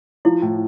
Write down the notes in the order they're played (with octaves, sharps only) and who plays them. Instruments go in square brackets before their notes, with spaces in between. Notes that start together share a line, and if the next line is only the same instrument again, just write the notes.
[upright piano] F3 [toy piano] E4
[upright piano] A2